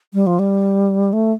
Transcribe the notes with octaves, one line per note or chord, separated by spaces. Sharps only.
G3
F3
G3
A3